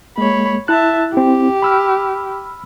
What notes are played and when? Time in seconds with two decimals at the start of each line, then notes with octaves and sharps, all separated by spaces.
0.18 G#3 A#3 C#5 B5
0.68 E4 E5 A5 F#6
1.14 C4 E4 G4
1.62 B5 E6 F6